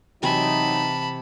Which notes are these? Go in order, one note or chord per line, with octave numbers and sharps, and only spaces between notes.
C3 E3 F#3 C4 D#4 A5 B5